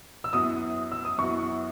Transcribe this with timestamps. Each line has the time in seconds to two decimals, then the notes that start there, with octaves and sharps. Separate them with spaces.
0.24 E6
0.33 F#2 E3 B3 F#4 D#6
0.92 E6
1.05 D#6
1.18 F#2 E3 B3 F#4 C#6